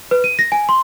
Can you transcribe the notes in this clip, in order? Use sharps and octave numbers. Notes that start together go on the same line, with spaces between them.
B4
D#7
A#6
G#5
C6